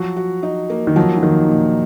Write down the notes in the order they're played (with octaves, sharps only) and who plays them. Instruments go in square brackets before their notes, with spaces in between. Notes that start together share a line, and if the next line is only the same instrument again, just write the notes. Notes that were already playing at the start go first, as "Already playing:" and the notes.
Already playing: [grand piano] F3 [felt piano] F#3 F#4
[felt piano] F#4
D#4
A#3
[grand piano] D#3
[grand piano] F3 [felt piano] F#3
[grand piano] F3
[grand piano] D#3 [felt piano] A#3
[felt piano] A#2